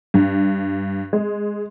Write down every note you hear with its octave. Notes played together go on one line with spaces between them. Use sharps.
G2
G#3